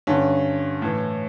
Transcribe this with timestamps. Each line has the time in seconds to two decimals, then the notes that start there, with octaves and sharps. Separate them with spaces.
0.07 G2 D3 C#4
0.82 A2 E3